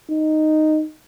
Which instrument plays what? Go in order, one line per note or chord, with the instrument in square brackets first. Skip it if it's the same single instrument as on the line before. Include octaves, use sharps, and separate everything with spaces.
[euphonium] D#4